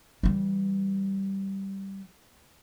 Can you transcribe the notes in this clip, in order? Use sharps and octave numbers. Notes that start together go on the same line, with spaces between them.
E3 G3